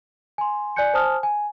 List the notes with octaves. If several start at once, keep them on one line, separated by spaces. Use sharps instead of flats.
G#5 C6
D5 G#5 F#6 G6 C#7
C5 G#5 A5 D#6 F6
G#5